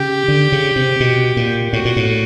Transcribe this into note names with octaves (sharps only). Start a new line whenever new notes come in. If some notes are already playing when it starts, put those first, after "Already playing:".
Already playing: C#3 G4
D3
C#3
C3
B2
A#2
A2 F#4
A#2
A2